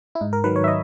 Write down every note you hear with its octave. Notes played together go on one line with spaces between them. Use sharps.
E4
G#2 D#4
A#4
D#3 F#3 B4
C#5
E5
D#5